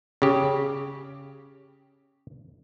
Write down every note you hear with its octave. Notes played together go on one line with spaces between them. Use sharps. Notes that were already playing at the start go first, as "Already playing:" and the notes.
C#3 G4